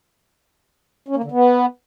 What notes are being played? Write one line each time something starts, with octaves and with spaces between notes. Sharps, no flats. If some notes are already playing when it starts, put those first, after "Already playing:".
C#4
A#3
D3
B3